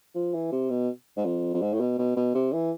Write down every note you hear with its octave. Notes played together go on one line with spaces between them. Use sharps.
F3
E3
C3
B2
G#2
F2
F2
G#2
A2
B2
B2
B2
C3
E3